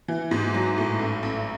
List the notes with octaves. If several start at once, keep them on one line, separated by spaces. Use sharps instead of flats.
E3
G#2
F#3
A2
A1
A1